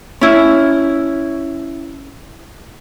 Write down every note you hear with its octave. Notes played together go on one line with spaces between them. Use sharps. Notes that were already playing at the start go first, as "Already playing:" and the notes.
C#4 E4